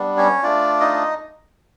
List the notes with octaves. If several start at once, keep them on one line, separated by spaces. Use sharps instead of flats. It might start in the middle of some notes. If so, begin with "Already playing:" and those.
Already playing: G3 B3 D4
C#4 C#5
A3 D4 F4 D5
D#4 D#5